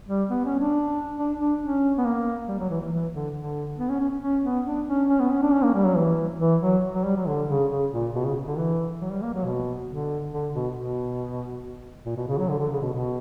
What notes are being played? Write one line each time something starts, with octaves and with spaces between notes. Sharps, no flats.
G3
B3
C#4
D4
D4
D4
C#4
B3
A#3
G3
F#3
E3
E3
E3
D3
D3
B3
C#4
C#4
C#4
B3
D4
C#4
C#4
B3
C#4
D4
C#4
A#3
G3
F#3
E3
E3
F#3
F#3
G3
F#3
D3
C#3
C#3
A#2
B2
C#3
D3
E3
F#3
G3
A#3
F#3
B2
D3
D3
B2
B2
A#2
B2
C#3
F#3
D3
D3
C#3
B2
B2